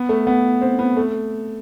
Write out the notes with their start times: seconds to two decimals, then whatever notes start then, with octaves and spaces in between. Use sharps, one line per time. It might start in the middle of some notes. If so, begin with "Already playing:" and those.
Already playing: B3
0.09 A3
0.27 B3
0.61 C4
0.79 B3
0.97 A3